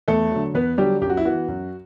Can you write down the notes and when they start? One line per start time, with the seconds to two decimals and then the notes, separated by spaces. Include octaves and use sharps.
0.08 E2 A3 A4
0.32 D3 F#3
0.54 E2 B3 B4
0.78 D3 F#3 G3 G4
1.01 F#2 G4
1.10 F#4
1.17 E4
1.25 E3 B3 F#4
1.48 F#2